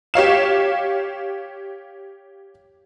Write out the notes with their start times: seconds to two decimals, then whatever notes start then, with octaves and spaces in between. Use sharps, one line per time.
0.14 G4 C#5 F5 E7